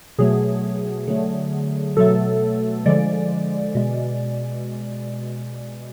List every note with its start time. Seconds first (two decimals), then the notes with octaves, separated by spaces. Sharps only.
0.19 B2 F#3 A3 G#4
1.07 D3 F#3 A3
1.97 B2 F#3 A3 A4
2.86 D3 F3 G#3 D5
3.75 B2 G#3